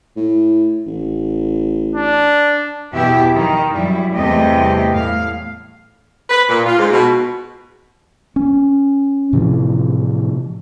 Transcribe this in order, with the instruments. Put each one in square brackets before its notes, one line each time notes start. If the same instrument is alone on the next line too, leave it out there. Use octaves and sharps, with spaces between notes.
[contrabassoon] A2
A1
[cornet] D4
[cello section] E2 B2 B3 E4 G4 E5
D#3
F#2 G3 E4
E2 C3 G3 A3 G4 D#5
A2 F5
[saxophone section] B4
A#2
F4
G#2
B2
[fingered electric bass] C#4
A2 C3 E3 F3